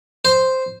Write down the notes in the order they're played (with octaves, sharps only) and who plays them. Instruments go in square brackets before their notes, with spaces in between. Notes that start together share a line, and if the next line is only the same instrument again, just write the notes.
[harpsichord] C5